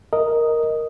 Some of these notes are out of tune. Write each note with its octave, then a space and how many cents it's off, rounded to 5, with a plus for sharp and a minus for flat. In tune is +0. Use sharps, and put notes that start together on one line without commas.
A#4 +0 D#5 +0